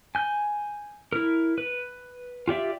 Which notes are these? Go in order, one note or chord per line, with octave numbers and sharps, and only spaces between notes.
G#5 G6
E4 A#4
B4
F4 G4 D5 E5